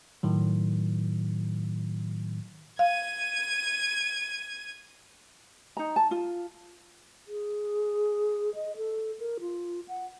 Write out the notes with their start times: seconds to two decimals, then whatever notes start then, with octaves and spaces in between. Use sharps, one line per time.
0.23 A2 D#3 F#3
2.79 F5 G#6 D#7
5.77 D#4 A#5
5.96 A5
6.11 F4
7.28 G#4
8.55 D#5
8.76 A4
9.19 A#4
9.40 F4
9.88 F#5